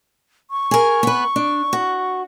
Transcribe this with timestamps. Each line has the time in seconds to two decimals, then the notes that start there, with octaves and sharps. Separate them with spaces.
0.51 C#6
0.71 G#4 A#4
1.03 B3 B4
1.36 D4
1.73 F#4